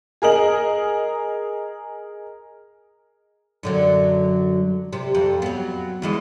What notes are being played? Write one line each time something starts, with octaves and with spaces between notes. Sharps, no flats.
G#4 A#4 D#5 F#7
F#2 D3 F#3
C3
F2
F#3 B3
E2 E3 G#3